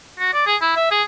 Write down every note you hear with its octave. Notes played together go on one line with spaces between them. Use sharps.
F#4
D5
G#4
E4
E5
G#4